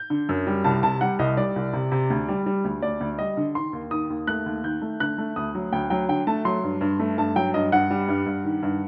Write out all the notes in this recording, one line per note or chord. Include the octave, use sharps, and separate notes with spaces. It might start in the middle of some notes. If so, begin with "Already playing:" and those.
Already playing: G6
D3
F#2
G3
C2 A5
C3 A5
G3 F#5
C2 D#5
G3 D5
C2
C3
C3
D2
G3
G3
D2
D2 D5
D2
G3 D#5
D3
D#3 C6
D#2
D#3 D#6
D#2
A3 F#6
D#2
D#3 G6
A3
D3 F#6
A3
D2 D#6
F#3
D2 G5
F#3 G5
D3 G5
A3 A5
F#3 C6
G2
G2
A3
G2 A5
F#3 G5
G2 D#5
G2 F#5
G3
G2
G2
D#3
G2